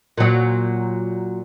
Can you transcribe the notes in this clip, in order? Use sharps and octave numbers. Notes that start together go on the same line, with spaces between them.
A#2 F#3